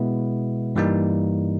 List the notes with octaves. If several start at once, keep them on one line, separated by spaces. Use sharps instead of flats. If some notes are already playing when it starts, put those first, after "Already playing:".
Already playing: B2 G#3 B3 E4
G2 E3 G3 A#3 D#4